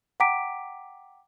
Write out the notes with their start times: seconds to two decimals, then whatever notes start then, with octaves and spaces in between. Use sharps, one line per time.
0.20 F#5 G5 A#5 D6 B6 D7